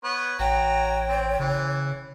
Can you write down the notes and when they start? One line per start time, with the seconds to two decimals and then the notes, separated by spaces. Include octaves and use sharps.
0.04 B3 B4 C#5
0.39 A1 F#4 C#5 G5 A#5
1.09 C4
1.39 C#3 E3